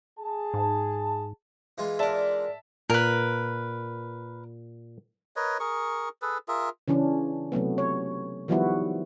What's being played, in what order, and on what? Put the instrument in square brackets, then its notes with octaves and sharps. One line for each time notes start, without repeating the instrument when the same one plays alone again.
[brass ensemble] G#4 A5
[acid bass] G#2
[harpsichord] E3 G#3 F4
[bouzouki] D4 A#4 [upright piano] E5 A5
[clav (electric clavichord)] A#2 [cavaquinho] A#4 B4
[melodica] A#4 B4 C#5 D#5
G#4 A#4 C#6
G#4 A4 B4
F4 G#4 A#4 E5
[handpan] C#3 E3 C#4 D4
C3 F#3 A3 B3
C#5
D#3 F3 G3 B3 E4 F#4